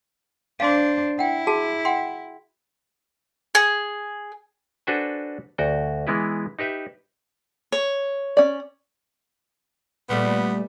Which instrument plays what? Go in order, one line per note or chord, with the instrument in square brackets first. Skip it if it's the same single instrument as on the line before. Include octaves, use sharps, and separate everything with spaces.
[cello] D4 C5 [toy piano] F5 C6
[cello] E4 [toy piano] F#5 G5
[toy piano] F#4 G#4 A5
F#5 G5 C6
[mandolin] G#4
[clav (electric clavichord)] D4 F#4 A4 B4 C5 G#5
D2 F#4 G5
E3 G#3 B3 E4 B4
D#4 G4 B4 E5
[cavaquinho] C#5
[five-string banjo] C#4 D5
[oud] A#2 G3 A3 [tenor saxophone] B3